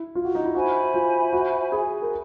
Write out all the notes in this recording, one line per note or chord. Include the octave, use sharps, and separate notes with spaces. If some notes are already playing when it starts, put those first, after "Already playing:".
Already playing: E4
F4
F#4
D#4
E4
F#4 C5 E5 G#5 B5
F4
F#4
G#4
A#4